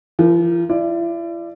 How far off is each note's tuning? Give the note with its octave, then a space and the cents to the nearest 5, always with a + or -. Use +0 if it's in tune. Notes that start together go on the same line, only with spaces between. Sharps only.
F3 -45 A#4 +0
E4 +40 D5 +10